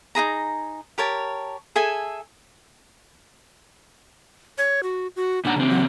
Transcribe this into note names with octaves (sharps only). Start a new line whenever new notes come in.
D#4 E4 G#4 A#5
G4 A#4 C#5 A5
G#4 A4 E5 G#5
C#5
F#4
F#4
A#2 D4 F#5 A#5
C#3 E3 C4
F#3